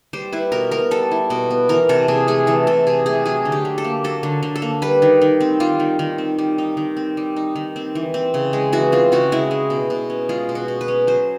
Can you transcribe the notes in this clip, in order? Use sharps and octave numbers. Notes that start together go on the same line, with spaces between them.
G3 C5
E4 B4
B2 A#4
B3 A#4
G3 A4
E4
B2
B3
E3 A#4
C3 A4
C3 G#4
A3 G#4
E3 A4
C3 A4
C3 G#4
A3 G#4
F#3 G#4
D3
G4
D3
A4
A#3
F#3 A4
D3
D3
A4
A#3
G3 B4
D#3
D#3
C4
G3 F4
D#3
D#3
C4
G3
D#4
D#3
C4
G3
D#4
D#3
C4
E3
C4
C#3
G#3
E3 F#4
C4 F4
C#3 F#4
G#3 E4
G#3
B2
B2
C#4
G#3 F4
B2
F#4
B2
B4
C#4
F#3 C5